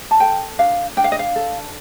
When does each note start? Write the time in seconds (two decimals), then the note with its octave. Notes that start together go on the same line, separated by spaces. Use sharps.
0.11 A5
0.20 A4 G5
0.58 D4 F5
0.97 D4 G5
1.04 F5
1.12 D#5
1.19 F5
1.36 A4